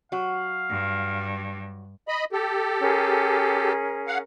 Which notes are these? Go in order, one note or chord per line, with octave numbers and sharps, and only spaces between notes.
F#3 F#4 F5
G2
D#5 B5
G4 A4
C#4 G#4 A#4
F5 F#5